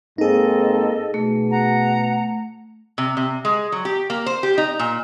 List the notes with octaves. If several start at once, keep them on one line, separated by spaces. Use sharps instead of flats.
G#2 A#3 C4 D#4 G#4 A4 D#5
B2 A3
F#5 A#5
C3
C3
G#3
F#3
G4
A#3
C5
G4
D#4
A#2